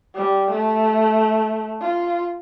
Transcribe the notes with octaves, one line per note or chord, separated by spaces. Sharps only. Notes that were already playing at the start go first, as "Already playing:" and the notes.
G3
A3
F4